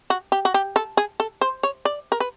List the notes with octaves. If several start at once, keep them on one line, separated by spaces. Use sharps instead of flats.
F#4
G4
F#4
G4
A4
G#4
A4
C5
C#5
D5
A#4
B4